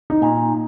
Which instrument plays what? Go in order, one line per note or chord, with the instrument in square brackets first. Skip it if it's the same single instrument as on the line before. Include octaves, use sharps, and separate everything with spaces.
[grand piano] D#4
[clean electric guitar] A#2